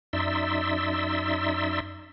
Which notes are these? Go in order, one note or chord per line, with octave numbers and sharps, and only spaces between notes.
F#2 D#4 D5 E5 C6 E6